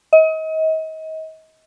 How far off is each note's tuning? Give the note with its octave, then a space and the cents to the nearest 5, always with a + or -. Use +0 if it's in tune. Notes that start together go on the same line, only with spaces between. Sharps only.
D#5 +35